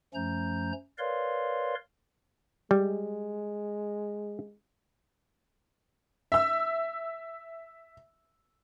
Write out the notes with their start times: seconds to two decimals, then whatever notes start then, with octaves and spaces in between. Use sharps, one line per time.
0.14 F#2 F3 A3 C#4 A#5 G6
0.98 A#4 B4 C#5 D5 F5 C6
2.71 G3 G#3
6.32 E5 E6